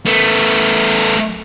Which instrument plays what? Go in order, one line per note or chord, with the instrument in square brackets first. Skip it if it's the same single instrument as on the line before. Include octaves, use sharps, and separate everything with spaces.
[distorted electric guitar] A3 B3